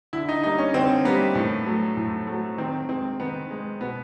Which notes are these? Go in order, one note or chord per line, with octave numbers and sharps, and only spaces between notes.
D3 E4
D#4
G3 A#3 D#4
C#4
D3 C4
G3 A#3 B3
A2
F#3 A3
A2
F#3 A3
D#3 C4
G#3 C4
D#3 B3
G#3
B2 B3